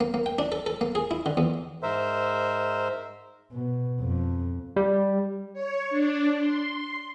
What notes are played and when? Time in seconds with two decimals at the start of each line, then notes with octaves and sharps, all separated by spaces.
0.01 A#3
0.14 A#3
0.26 G5
0.39 D4
0.52 A4
0.66 A4
0.81 A#3
0.95 G#4
1.11 E4
1.26 D3
1.37 E2
1.83 G#2 A#4 C5 E5
3.53 B2
4.00 F2
4.76 G3
5.53 C#5
5.90 D4
6.38 C6